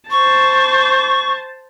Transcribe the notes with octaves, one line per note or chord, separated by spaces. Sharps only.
C5 A5 C#6